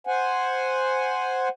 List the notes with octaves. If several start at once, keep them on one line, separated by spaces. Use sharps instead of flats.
C5 F#5 G#5